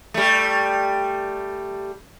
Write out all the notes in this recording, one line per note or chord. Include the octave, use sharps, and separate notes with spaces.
G3 A3